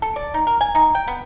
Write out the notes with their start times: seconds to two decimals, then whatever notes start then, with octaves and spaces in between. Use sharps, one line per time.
0.02 A4
0.16 D5
0.34 D#4
0.47 A#4
0.61 G#5
0.75 D#4
0.95 G5
1.08 B3